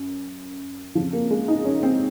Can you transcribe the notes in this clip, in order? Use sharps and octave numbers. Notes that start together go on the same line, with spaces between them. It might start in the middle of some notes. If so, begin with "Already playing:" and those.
Already playing: F#2
F2 C#3 F3
A#3
G#3
D#4
C#4
C4